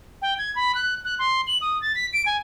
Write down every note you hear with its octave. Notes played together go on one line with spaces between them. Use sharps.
G5
G#6
B5
F#6
F#6
C6
F#7
D#6
A6
B6
D7
G#5